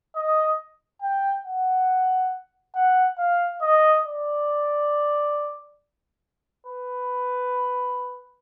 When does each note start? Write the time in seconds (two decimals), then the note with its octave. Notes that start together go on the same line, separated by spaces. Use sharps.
0.16 D#5
1.02 G5
1.46 F#5
2.75 F#5
3.18 F5
3.62 D#5
4.06 D5
6.66 B4